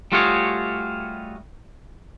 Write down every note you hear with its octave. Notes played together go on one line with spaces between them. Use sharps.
G3 A3 F4 F#4 G#4 C#5